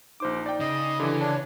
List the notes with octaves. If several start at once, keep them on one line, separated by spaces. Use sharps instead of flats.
A#1 D#4 C5 D6
D5 G5
C#3 D#5
D3 E3 G4
D4 C#5